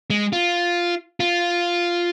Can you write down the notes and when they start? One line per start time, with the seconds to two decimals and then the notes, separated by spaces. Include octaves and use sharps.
0.10 G#3
0.33 F4
1.20 F4